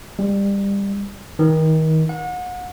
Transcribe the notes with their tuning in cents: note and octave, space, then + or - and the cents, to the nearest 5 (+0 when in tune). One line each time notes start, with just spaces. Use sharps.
G3 +25
D#3 +30
F#5 -35